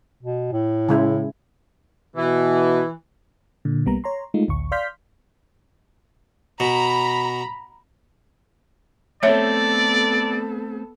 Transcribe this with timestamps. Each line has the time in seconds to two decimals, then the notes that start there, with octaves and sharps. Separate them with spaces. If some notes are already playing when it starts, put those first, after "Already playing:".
0.23 B2
0.52 A2
0.89 C#3 G#3 E4
2.16 B2 E3
3.65 A#2 D3
3.86 B1 G3 A#3 B3 A#5
4.04 C#5 A#5 C6
4.34 G#3 A3 D#4 F4
4.48 A1 D2 C#6
4.72 D5 F5 C6 F6 G6 B6
6.60 B2 A#5 B5
9.23 A3 B3 C4 A4 C#5 D5 E5